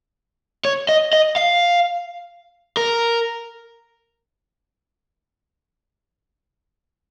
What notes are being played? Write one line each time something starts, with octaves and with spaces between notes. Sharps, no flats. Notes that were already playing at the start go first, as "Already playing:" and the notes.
C#5
D#5
D#5
F5
A#4